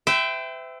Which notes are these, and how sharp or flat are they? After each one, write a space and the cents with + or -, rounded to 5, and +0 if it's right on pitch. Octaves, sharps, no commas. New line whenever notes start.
C5 -45 E5 +0 G5 +0